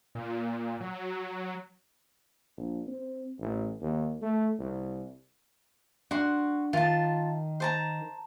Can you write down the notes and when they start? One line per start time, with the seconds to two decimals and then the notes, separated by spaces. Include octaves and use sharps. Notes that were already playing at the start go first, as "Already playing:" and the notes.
0.15 A#2
0.80 F#3
2.57 A#1
2.87 C4
3.40 A1
3.81 D#2
4.22 A3
4.59 C2
6.11 D4 F#4 F#5 C6
6.73 D#3 F4 A5
7.60 C5 A5 A#5